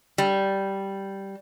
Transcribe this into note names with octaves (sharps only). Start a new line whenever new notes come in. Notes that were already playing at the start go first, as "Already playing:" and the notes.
G3